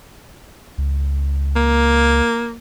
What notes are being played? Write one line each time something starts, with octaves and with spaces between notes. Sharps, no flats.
C#2
A#3